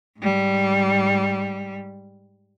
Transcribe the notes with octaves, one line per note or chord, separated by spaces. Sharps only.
G#2 G3